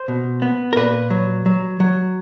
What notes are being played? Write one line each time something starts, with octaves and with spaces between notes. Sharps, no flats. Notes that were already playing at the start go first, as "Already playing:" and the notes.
Already playing: C5
B2
B3
A#4
A#2 B4
F#3
F#3
F#3